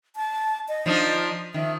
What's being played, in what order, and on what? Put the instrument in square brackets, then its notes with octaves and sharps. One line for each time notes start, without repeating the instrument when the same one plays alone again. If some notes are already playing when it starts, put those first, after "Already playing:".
[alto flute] A5
D#5
[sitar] F3 D4 D#4
[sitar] D#3 F3 [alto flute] E5